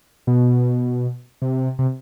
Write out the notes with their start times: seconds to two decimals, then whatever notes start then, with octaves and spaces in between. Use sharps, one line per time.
0.27 B2
1.42 C3
1.79 C3